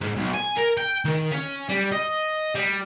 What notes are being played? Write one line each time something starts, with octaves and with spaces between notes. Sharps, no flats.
G#2
B1
G#5
A#4
G5
D#3
C#4
G3
D#5
G3